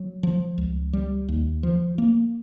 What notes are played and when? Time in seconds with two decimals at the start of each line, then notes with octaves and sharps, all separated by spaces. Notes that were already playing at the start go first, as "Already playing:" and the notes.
Already playing: F#3
0.23 F3
0.58 C#2
0.93 G3
1.28 D#2
1.63 F3
1.98 A#3